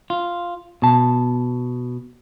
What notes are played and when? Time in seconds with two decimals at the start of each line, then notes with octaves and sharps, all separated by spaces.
0.10 F4
0.82 B2 A5